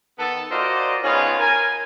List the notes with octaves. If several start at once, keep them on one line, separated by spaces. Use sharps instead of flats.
D#3 B3 A4
F4 F#4 A#4 C5 D5 D#5
D#3 B3 C#4 D#4 F4 G#4
A#4 G#5